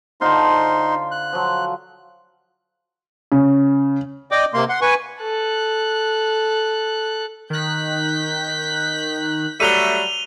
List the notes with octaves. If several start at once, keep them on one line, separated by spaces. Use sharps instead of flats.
D3 D#4 F4 C5 C6
F#6
F3 F#3
C#3
D5 D#5 G5 D6
C3 A#3 C6
F#5 C6
B4 G#5 C#6
A4 F#6
D#3 F#6 G6 B6
F#3 G3 A3 D#7 F7 G7